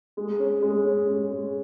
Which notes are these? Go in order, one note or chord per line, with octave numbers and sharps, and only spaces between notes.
G#3
C#4
G#3
C#4
G#3
G#3